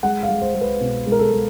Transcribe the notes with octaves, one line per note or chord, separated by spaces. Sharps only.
G#3 F#5
F5
G#3
C5
G#3
B4
B2
G#3
A#4
A4
G#3